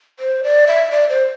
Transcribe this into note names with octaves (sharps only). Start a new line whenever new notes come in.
C5
D5
E5
D5
C5